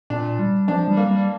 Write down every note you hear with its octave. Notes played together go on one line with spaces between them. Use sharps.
A#2 D4
G3
F3 D4
G3
A#3
G3